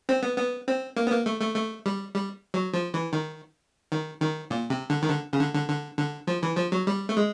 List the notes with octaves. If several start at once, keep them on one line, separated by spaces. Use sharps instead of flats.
C4
B3
B3
C4
A#3
B3
A#3
A3
A3
A3
G3
G3
F#3
F3
E3
D#3
D#3
D#3
A#2
C3
D3
D#3
D3
C#3
D3
D3
D3
D3
F3
E3
F3
F#3
G3
A3
G#3